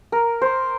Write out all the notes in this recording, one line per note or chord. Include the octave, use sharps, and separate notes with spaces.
A#4
C5